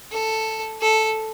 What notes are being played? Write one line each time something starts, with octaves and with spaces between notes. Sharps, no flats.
A4
A4